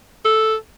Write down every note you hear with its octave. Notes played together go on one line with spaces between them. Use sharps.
A4